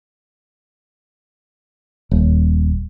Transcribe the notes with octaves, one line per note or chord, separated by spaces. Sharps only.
D#1